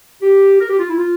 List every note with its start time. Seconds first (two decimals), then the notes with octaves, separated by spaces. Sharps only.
0.22 G4
0.60 A#4
0.70 G4
0.79 F4
0.89 E4
0.98 F4